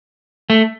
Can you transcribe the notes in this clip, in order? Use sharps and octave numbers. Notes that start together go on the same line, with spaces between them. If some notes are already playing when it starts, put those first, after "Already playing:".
A3